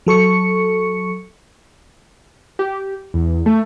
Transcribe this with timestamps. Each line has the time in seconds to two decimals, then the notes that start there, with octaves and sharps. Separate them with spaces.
0.06 F#3 A4 C#6 C#7
2.59 G4
3.14 E2
3.46 A3